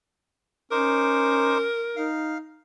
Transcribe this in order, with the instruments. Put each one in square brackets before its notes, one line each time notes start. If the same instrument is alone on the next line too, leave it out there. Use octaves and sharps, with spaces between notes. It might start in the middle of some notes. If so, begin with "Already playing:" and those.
[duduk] C#4 [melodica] D#4 C5 D6 [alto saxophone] A#4
[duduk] D#4 [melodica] F5